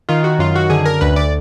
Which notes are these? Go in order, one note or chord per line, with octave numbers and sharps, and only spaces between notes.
D#3 F4
F#4
F#2 F4
F#4
D3 G#4
A#4
D2 B4
D5